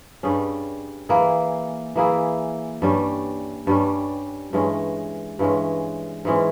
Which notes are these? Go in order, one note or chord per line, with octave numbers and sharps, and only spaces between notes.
G2 G3 C#4 G#4
E3 A#3 E4 G#4
E3 A#3 E4 G#4
G2 G3 C#4
G2 G3 C#4
G2 E3 G#3 C#4
G2 E3 G#3 C#4
G#2 E3 G#3 C#4